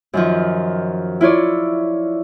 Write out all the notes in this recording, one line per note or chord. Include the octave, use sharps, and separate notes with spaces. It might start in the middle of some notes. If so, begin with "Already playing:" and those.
F#2 D#3 F3
E4 F4 C#5 D5